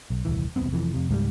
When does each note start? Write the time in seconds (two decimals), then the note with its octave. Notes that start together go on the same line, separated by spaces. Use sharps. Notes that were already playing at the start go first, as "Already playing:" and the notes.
0.10 B1
0.25 D#1 C2 E3
0.56 E1 C2 B3 C4
0.71 F1 F2 E3
0.94 F2 C3
1.09 C#2 G#2 F3 G3